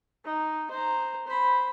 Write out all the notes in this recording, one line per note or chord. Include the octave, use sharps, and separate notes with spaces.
D#4
C5 A#5
C5 B5